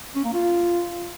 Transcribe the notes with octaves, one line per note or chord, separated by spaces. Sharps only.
C#4
A#3
F4